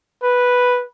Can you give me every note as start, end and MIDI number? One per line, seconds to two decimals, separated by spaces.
0.22 0.84 71